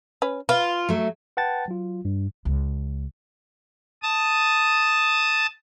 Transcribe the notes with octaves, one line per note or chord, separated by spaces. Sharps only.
C#4 B4
F4 B4
F#3 A3
B4 F#5 G5 A5 A6
F#3 F4
G2
C#2
A5 D#6